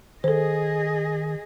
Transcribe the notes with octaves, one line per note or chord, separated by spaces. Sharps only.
D#3 G#4 A4 C5 D#5